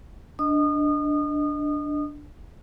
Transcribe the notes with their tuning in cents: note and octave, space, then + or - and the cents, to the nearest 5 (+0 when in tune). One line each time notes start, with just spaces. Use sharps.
D4 +0 D#5 +0 D#6 -30